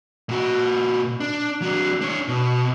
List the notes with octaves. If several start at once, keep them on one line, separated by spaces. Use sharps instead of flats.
A#2 F#4
D4
F#3 D4
D4 C#5
B2